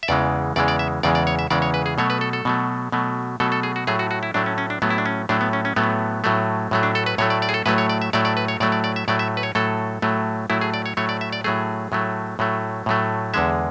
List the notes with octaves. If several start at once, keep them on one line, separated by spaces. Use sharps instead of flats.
E5
E2 C#3 E3 G#3 D5
E2 C#3 E3 G#3 D5
D5
E5
E2 C#3 E3 G#3 D5
D5
C#5
E5
E2 C#3 E3 G#3 D5
C#5
B4
G#4
B2 F#3 A3 C#5
B4
A4
A4
B2 F#3 A3
B2 F#3 A3
B2 F#3 A3 A4
A4
G#4
F#4
A2 F#3 A3 G#4
F#4
F#4
E4
A2 F#3 A3 D4
C#4
C#4
D4
A2 F#3 A3 B3
E4
D4
C#4
A2 F#3 A3 D4
B3
C#4
C#4
A2 F#3 A3 B3
A2 F#3 A3
A2 F#3 A3
D4
A4
B4
A2 F#3 A3 C#5
D5
D5
G#4
A4
A2 F#3 A3 B4
C#5
D5
E5
A2 F#3 A3 D5
D5
B4
C#5
A2 F#3 A3 D5
D5
D5
E5
A2 F#3 A3 D5
E5
B4
C#5
A2 F#3 A3 A4
A2 F#3 A3
A2 F#3 A3 E4
G#4
D5
C#5
A2 F#3 A3 C#5
D5
E5
D5
A2 F#3 A3 G#4
A2 F#3 A3
A2 F#3 A3
A2 F#3 A3
E2 D3 G#3 E5